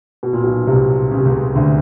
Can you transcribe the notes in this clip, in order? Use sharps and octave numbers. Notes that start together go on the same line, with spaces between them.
B2
A#2
B1 B2
C2 C3
C#3
C3
C#2 C#3
D2 D3